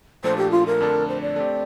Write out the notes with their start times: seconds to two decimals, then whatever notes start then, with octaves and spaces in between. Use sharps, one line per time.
0.24 A#2 F3 A3 D4 A4 C5
0.37 G4
0.51 F4
0.66 A#4
0.80 F2 D3 A3 D4 A4
1.08 C5
1.22 D5
1.36 A3 C4 G4